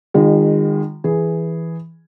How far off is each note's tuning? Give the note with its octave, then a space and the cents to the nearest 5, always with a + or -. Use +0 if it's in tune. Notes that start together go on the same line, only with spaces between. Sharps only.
D#3 -25 G#3 -40 F4 +10
E3 +0 G#4 +0